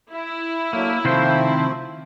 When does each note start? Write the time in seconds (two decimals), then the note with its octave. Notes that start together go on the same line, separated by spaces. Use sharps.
0.12 E4
0.73 D3 F#3 A3 A#3
1.05 C3 D#3 F3 A3 C4 F4 C5